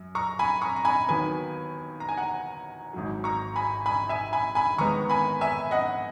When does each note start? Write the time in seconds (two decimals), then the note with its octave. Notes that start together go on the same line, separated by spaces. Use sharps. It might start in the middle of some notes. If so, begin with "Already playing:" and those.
Already playing: F#2
0.15 A#5 C#6
0.39 G#5 B5
0.61 A#5 C#6
0.76 A#5
0.85 G#5 B5
1.08 D#2 D#3 F#3 B3 G#5 B5
2.00 A#5
2.09 G#5
2.17 F#5 A#5
2.93 G#1 G#2 F#3
3.24 A#5 C#6
3.56 G#5 B5
3.86 G#5 B5
4.09 E5 G#5
4.33 G#5 B5
4.55 G#5 B5
4.78 D#2 D#3 G#3 B3 A#5 C#6
5.09 G#5 B5
5.41 E5 G#5
5.71 D#5 F#5